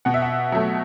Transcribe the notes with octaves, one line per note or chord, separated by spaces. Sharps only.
B2 F#5
E5
F#5
F#3 A3